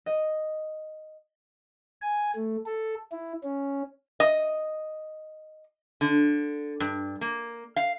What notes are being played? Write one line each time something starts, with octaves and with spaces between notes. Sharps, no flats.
D#5
G#5
A3
A4
E4
C#4
D#5
D3
G2
A#3
F5